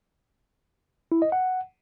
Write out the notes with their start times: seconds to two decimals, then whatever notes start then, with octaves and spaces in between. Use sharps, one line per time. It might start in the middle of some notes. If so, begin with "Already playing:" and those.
1.12 E4
1.22 D#5
1.32 F#5